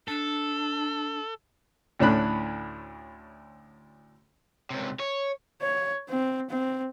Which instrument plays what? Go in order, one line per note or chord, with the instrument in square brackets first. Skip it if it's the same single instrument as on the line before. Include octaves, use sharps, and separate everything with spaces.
[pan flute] D4 [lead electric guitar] A4
[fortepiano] D2 A2 C#4 D4 B5 F#6
[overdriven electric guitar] C#2 C3
C#5
[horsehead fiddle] C#5
C4
C4